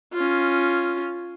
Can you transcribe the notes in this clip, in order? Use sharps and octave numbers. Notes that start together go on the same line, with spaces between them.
C#4 F4